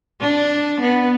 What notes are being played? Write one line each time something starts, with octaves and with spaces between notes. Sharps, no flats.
D4
B3